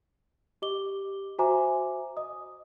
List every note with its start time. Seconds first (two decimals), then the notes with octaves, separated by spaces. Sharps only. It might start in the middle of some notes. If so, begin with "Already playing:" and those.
0.62 G4 D#5 D6 G7
1.39 F#4 C5 E5 G#5 A#5 D6
2.17 D#5 D#6